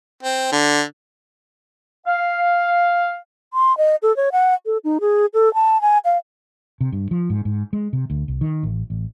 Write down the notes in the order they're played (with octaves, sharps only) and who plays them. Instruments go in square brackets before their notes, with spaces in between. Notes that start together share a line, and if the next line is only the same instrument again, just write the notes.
[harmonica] C4
D3
[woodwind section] F5
[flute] C6
D#5
A4
C#5
F#5
A4
D#4
G#4
A4
A5
G#5
F5
[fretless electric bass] C3
G2
F3
G#2
G#2
G#3
C3
D2
C2
D#3
A1
A1